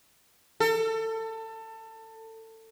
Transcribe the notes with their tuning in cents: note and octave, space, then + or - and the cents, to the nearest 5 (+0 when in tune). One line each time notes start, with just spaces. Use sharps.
A4 +25